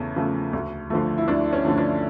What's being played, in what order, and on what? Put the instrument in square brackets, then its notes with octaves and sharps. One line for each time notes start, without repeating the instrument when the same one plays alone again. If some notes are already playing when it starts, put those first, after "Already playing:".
Already playing: [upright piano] E2 C#3 A3
C#3 F3 A3
D2
D3 F3 A3
E4
D2 D4
C#4
D3 F3 A3
D4